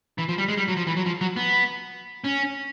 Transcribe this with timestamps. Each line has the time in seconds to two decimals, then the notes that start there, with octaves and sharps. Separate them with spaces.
0.18 E3
0.29 F3
0.38 G3
0.48 G#3
0.57 G3
0.68 F#3
0.77 F3
0.87 E3
0.97 F#3
1.06 F3
1.21 F#3
1.36 B3
2.24 C#4